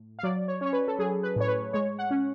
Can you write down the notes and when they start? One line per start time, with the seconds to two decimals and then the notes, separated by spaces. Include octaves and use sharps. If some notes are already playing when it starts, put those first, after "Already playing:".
Already playing: A2
0.19 F5
0.23 F#3 D5
0.48 C#5
0.61 C#4 C#5
0.73 B4
0.88 A4
0.99 F#3 G#4
1.23 B4
1.36 A2 C#5
1.48 B4
1.73 G#3 C#5
1.99 F#5
2.11 C#4